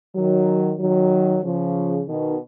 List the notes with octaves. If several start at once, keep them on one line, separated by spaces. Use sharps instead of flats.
D#3 F#3
D#3 F#3
C#3 F3
B2 D#3